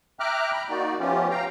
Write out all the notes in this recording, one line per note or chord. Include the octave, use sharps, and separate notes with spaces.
E5 G5 A#5 D6 F6 F#6
G5 A#5 B5
A#3 D#4 F#4 D5
F3 A3 B3 C#4 F4 G4
F5 G5 A#5